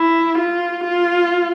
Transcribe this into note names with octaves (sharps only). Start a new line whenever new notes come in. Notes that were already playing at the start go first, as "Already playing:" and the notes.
Already playing: E4
F4
F4